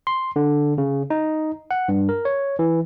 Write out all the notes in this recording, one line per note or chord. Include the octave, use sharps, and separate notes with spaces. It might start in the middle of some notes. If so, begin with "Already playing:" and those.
C6
D3
C#3
D#4
F#5
G2
A#4
C#5
E3